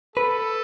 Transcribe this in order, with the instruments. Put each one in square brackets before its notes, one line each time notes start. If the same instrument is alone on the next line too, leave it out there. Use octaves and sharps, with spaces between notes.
[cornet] A4 [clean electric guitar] B4